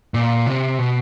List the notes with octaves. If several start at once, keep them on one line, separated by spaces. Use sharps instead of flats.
A#2
C3
B2